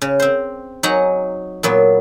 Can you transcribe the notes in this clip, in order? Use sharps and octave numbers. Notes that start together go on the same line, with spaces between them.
C#3
C4 C5
F#3 D#4 F#5 G#5 A#5
A#2 F#3 B3